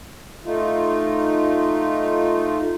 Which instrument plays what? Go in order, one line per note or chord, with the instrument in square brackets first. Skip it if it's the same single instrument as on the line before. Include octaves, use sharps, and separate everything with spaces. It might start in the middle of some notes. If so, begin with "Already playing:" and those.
[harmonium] A3 D#4 F4